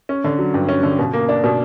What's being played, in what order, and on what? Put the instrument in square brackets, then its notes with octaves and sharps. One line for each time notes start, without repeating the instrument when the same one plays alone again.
[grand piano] C#4
D3
F#3
G2
C#4
D3
B2
A#3
D4
B2